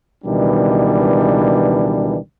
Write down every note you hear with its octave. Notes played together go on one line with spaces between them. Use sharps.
C#2 B2 D#3 E3 G3 D4